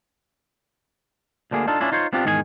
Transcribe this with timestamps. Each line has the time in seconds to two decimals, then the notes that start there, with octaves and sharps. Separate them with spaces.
1.51 D2 D3 A#3 G#4
1.67 D4 D#4 F4 A4
1.80 C#4 D4 E4 F4
1.92 D#4 F4 C5 C#5
2.13 B3 C4 D4 F4 G4
2.25 E2 G#2 D#3 G#4 A#4 G#5